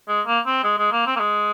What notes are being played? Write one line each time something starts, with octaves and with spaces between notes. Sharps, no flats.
G#3
A#3
C4
G#3
G#3
A#3
C4
A#3
G#3